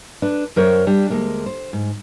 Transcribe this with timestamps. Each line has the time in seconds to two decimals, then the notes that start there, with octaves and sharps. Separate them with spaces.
0.22 D4 B4
0.56 F#2 A#4 C5 C#5
0.87 G3 D4
1.10 D2 G#3 A#3
1.46 C5
1.73 G#2